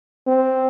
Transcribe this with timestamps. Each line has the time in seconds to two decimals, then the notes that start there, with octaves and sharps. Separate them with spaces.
0.27 C4